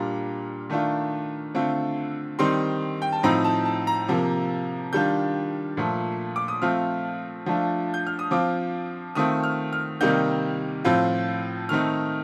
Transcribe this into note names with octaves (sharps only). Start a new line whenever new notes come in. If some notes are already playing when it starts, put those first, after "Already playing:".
Already playing: A#2 G3 D4 F4 A#5
D#3 A3 D4 F4
D3 A3 C4 F4
D#3 G3 C4 D#4 C6
G5
A5
A2 F3 C4 D#4 A#5
A5
A5
A#5
C3 F3 A#3
D#3 G3 D4 F4 G6
A#2 F3 A3
D6
D#6
F3 A3 C4 F4 F6
F3 A3 D4 F4
G6
F6
D#6
F3 C4 F4 D6
D#3 A3 C4 F4 D#6
F6
F6
C3 D#3 G3 A#3 D#4 G6
A2 F3 C4 F4
D#3 A3 C4 D#4 F6